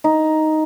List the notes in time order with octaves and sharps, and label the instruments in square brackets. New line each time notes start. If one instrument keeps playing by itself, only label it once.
[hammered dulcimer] D#4